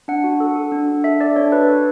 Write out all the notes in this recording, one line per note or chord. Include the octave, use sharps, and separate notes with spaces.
D4 F#5
F#4
A4
A4
D4
D4
A4 E5
A4 D5
D4 C#5
F#4 B4
A4